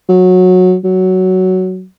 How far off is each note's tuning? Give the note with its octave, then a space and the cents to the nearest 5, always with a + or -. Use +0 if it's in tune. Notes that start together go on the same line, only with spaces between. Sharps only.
F#3 -15
F#3 +10